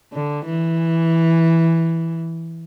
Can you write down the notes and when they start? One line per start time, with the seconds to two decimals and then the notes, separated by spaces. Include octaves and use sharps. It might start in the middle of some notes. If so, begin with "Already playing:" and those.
0.13 D3
0.45 E3